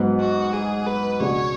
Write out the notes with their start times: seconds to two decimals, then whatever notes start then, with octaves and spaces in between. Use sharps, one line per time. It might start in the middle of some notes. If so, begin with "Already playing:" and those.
Already playing: G#2 F#3 B3
0.19 F#4
0.53 G#4
0.86 B4
1.20 C#2 B2 G#3 D4 G#4 C#5